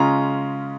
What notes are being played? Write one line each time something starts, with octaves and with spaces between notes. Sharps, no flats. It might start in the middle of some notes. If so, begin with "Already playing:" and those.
Already playing: C#3 G#3 C#4 F4 A#5